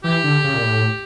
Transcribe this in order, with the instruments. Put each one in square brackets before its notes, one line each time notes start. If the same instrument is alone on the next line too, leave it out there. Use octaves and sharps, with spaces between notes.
[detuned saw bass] E3 [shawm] G4
[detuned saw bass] D3
C#3
A#2
A2